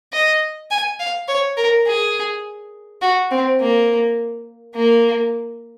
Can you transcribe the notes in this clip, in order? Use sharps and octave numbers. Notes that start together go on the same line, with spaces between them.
D#5
G#5
F5
C#5
A#4
G#4
F#4
C4
A#3
A#3